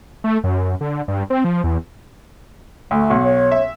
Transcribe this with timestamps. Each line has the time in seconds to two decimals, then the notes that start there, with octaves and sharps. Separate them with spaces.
0.24 A3
0.44 F#2
0.81 D3
1.08 G2
1.30 C4
1.45 F3
1.64 E2
2.91 D2 A3
3.10 B1 F#4
3.23 C#5
3.51 E5